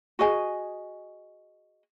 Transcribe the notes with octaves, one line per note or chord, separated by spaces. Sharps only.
F#4 G#4 D#5 G#5